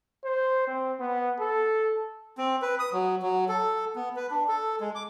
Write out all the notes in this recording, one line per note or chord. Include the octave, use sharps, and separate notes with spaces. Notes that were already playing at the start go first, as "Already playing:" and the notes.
C5
C4
B3
A4
C4
B4
D#6
F#3
F#3
A4
B3
B4
D4
A4
G#3
D6